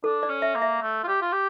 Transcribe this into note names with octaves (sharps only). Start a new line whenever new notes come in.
D4 A4
D5
C#4
E5
A#3
E5
A3
F4
G4
F4
G4